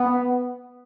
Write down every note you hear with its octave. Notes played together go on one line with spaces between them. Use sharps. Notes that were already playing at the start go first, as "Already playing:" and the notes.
Already playing: B3